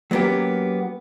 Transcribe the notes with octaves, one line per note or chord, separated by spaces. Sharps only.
F#3 A#3 B3 C#4 G4